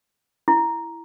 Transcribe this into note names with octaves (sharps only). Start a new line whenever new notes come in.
E4